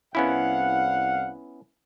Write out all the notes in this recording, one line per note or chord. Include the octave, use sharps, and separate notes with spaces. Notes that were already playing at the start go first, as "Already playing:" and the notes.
C2 B3 C#4 E4 F5 F#5